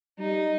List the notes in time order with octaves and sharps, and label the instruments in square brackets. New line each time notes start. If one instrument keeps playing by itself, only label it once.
[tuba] G3 [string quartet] D#4